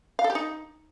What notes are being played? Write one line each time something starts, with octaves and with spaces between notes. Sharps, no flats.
F5
A4
G4
D#4